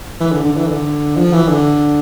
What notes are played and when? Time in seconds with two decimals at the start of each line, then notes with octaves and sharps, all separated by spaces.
0.21 E3
0.32 D3
0.45 D3
0.57 E3
0.69 D3
1.17 F3
1.33 E3
1.49 D3